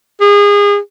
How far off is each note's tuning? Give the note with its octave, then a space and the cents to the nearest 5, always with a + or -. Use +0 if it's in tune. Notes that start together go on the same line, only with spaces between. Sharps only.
G#4 -30